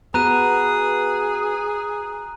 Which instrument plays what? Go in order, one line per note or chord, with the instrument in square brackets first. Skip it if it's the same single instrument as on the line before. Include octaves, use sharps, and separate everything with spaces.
[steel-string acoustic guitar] B3 F#4 B4 [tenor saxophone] G#4 [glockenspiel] A#5 F#6 D#7